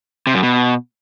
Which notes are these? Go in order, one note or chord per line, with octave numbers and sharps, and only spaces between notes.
C3
F#2
B2